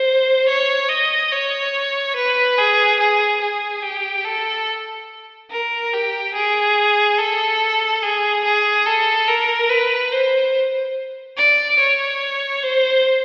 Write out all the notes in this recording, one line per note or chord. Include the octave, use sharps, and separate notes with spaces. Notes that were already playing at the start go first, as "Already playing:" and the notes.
Already playing: C5
C#5
D#5
C#5
B4
G#4
G#4
G#4
G4
A4
A#4
G4
G#4
A4
G#4
G#4
A4
A#4
B4
C5
D5
C#5
C5